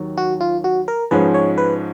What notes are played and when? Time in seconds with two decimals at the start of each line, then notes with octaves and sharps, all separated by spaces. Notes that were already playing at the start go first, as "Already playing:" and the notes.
Already playing: D#2 D#3 F#3
0.17 F#4
0.40 F4
0.64 F#4
0.88 A#4
1.11 G#2 F3 G#3 C#4 B4
1.34 C#5
1.58 B4